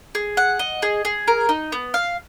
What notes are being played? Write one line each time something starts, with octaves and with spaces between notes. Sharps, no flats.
G#4
F#5
D#5
G#4
G#4
A#4
D#4
B3
F5